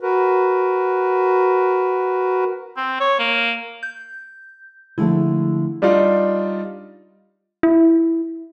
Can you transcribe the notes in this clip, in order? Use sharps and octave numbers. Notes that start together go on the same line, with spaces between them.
F#4 A#4 B4
C4
C#5
A#3
G6
D3 F3 G#3 A3 E4
G3 D4 D#4 F4
E4